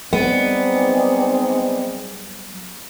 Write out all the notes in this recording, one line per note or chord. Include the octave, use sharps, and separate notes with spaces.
F#3 G3 B3 C4 D#4 G#4 D5